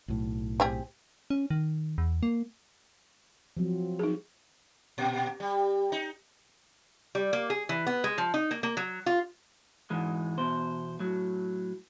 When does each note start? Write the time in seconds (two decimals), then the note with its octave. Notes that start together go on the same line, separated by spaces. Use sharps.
0.08 B1 A2
0.60 C4 G4 G#4
1.30 C#4
1.50 D#3
1.98 E2
2.23 A#3
3.57 F3 F#3 C4
3.99 D#4 G#4
4.98 A#2
5.40 G3
5.92 D#4
7.15 G3
7.33 A#3
7.50 G#4
7.69 E3
7.86 B3
8.04 G#3
8.18 F3
8.34 D#4
8.51 A#3
8.63 A#3
8.77 F#3
9.06 F4
9.90 G#2 E3 G#3
10.38 E2 B2 C5
10.99 A2 F#3